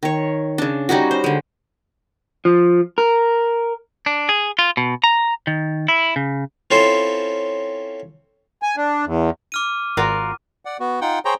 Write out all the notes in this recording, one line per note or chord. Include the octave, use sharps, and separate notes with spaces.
D#3 C#5
C#3 D4
G3 C#4 D#4 F#4
C5
D3 G#3
F3
A#4
D4
G#4
F4
B2
A#5
D#3
E4
C#3
C4 C#4 E4 F4 A4 C5
G#5
D4
E2
D6 F6 D#7
G#1 F4 F#4 A#4 D5
D5 F#5
B3 F#4
D#4 F4 F#5 G5
G#4 C5 C#5 G5 A#5